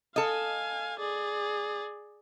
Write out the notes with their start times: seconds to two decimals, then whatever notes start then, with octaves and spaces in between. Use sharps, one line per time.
0.16 A4 D#5 F5 G#5
0.99 G#4 D5